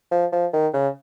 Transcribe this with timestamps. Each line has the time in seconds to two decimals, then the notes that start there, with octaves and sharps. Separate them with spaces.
0.12 F3
0.32 F3
0.53 D#3
0.74 C#3